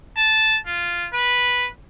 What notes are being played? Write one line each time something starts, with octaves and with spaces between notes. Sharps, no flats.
A5
F4
B4